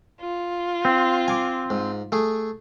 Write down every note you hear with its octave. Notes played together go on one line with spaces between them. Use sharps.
F4
C4
G#5 D6
G#2
A3 G#4